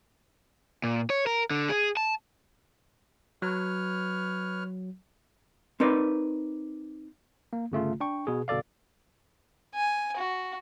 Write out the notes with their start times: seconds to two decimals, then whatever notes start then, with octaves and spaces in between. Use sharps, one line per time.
0.84 A#2
1.10 C#5
1.27 A#4
1.51 D3
1.69 G#4
1.97 A5
3.42 F#3 B4 C#5 F6
5.80 C4 D#4 A#4 B4 D5
7.53 A#3
7.72 G1 C#3 A3 F4
8.00 D4 G5 C#6
8.27 B2 G#4
8.48 G1 B2 A4 D5 F5
9.75 G#5
10.17 F#4